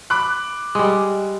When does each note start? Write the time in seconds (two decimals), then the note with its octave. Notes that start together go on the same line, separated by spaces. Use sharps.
0.10 B5 D6 F#6
0.75 G3 G#3